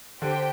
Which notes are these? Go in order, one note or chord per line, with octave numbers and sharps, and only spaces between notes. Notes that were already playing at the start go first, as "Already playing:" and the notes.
D3 G4 C5 G5